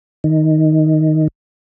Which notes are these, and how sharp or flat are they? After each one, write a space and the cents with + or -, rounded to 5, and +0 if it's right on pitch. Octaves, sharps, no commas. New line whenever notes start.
D#3 +5